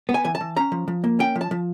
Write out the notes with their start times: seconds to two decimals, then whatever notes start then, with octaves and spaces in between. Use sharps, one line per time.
0.09 B3
0.14 G#5
0.25 E3 G#5
0.35 A5
0.41 E3
0.56 C#4 A#5
0.72 F3
0.88 F3
1.04 A#3
1.19 C#4 G5
1.36 F3
1.41 A5
1.51 F3